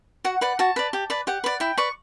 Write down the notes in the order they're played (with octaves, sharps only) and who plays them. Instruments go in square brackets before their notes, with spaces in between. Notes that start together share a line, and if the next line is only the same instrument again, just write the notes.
[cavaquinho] F#4 F#5
B4 D5 F#5
F#4 A5
B4 D5
G4
B4 D5
G4 F#5
B4 D5
E4 G5
B4 D5 C#6